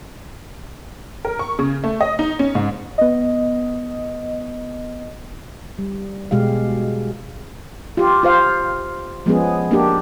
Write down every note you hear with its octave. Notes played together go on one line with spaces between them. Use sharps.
A#4
C#6
C#3
A3
D#5
D#4
C#4
G#2
B3 D#5
G3
B2 G#3 G4 F5
F4 G4
F4 C5 F5
F3 G#3 B3 C#4 G#4
A#3 D4 G4